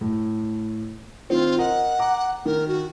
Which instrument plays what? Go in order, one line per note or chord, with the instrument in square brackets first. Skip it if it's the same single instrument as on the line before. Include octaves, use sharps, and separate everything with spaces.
[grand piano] A2
[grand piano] D#3 C4 [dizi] F4
[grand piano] A#4 D#5 [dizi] F#5
[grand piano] A#5 D6
[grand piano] D#3 [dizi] A#4
[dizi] F#4